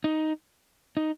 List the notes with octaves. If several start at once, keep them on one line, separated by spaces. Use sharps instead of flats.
D#4
D#4